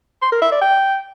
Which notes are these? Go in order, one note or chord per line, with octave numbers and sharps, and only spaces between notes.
C6
A#4
E5
D5
G5